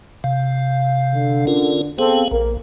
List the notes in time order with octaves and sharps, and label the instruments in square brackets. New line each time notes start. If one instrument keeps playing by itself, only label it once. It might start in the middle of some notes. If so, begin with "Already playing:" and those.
[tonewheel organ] C3 F5
[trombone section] D3
[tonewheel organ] C#4 F4 A#4
[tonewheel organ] B3 G#4 F5 [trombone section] C4 A4
[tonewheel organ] A#1 [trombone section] A#3